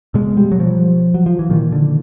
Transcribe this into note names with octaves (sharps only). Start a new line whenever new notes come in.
B2 G#3
G3
F#3
F3
F#3
F3
E3
A#2 D#3
D3